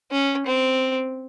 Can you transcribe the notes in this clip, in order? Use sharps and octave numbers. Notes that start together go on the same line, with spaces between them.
C#4
C4